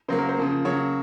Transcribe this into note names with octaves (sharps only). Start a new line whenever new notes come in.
C#3 F#3 A#3 C5
A#4
C5
C#3 F3 A#3
C#3 F#3 A#3 C#5